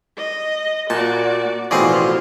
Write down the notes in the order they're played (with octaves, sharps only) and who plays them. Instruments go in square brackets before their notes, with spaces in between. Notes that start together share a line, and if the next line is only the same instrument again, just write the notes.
[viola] D#5
[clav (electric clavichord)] A#2 [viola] F#4 D5 [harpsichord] A5
[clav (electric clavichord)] A1 G#4 D5 [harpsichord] B2 F3 C4 [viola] E4 F4